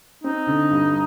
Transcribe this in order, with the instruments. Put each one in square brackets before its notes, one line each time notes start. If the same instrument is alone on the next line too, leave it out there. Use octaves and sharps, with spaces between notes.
[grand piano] C4 [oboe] D#4
[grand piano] D3
G2